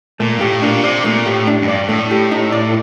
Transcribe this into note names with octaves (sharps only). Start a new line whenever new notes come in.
A#2 A3
G2
A2 G4
A#2 D4
C3 D5
A#2 A3
A2 G4
D4
F#2
G2 D5
G2
A2 A3
G4
D#4
D5